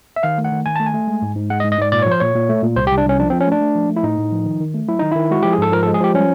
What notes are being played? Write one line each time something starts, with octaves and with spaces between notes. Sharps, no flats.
E5
D#3 F5
A3
F#5
D#3
D#3 G#5
A3 A5
G#5
A3
G#3
G#2
G#2
G#3 F#5
D#5
G#2
D#5
G#2 D5
A#2 D5
F3 C#5
C5
A#2 C#5
A#2
A3
A#2
C2 C5
G4
C2
D4
C2 C#4
F3 D4
C4
F3
C#4
A3 D4
A3
F3
A3
E4
A2 D#4
A2
F3
D#3
D#3
A3
F#3 E4
D#3 D#4
D#3 E4
G#3 F#4
F3 G4
G#4
G#2 A4
F3 A#4
A4
G#3
G#4
F3 G4
G3 C#4